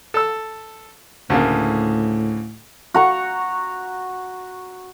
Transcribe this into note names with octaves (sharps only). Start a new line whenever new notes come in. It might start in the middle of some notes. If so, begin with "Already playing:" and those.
A4 E6
D2 A2 C#3 A#3
F#4 A#5 C#6